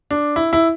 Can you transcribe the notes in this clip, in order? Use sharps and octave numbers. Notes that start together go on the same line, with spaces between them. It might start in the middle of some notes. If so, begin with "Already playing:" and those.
D4
E4
E4